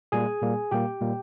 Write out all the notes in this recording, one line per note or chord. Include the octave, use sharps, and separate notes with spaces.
A#2 G3 A#3 G#4 G#5
A#2 G3 A#3
A#2 G3 A#3 G4 G5
A#2 G3 A#3